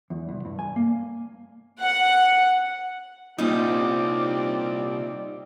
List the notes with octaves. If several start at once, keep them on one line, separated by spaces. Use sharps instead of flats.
E2
C2
G2
G#5
A#3
F#5
C2 A#2 G3 C4 C#4 D#4 D5